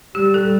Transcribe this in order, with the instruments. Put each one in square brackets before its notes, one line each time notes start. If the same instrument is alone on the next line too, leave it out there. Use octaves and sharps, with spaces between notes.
[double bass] G3 [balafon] G4
[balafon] A4